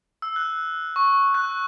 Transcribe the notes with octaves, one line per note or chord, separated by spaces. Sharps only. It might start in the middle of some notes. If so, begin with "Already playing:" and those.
E6
F#6
C#6
F#6